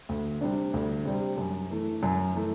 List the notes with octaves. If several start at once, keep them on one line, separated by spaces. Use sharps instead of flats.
D2
C3 G3 D4
D2
C3 G3
F#2
E3 A3
F#2
E3 A3